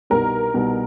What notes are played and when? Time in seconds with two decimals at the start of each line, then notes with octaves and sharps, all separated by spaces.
0.10 C2 B2 G3 B3 D#4 A#4
0.54 C2 B2 G3 B3 D#4